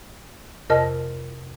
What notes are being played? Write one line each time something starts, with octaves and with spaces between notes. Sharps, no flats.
F2 C3 A#4 D#5 A5 F6